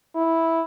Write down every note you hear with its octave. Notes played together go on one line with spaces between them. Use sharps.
E4